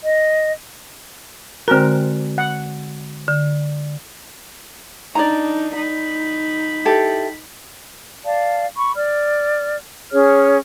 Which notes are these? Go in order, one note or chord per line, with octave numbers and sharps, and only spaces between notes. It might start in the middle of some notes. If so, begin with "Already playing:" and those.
D#5
D3 G#3 C4 F#4 A#4
F#5
D3
D4 D#4 D5 A#5
D#4 B5
E4 G4 A4
D5 F5 A5
B5 C#6
D5 F6
C#4 G#4 C#5 F6